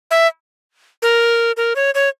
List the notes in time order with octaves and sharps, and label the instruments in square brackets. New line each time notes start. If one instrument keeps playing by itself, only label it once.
[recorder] E5
A#4
A#4
C#5
C#5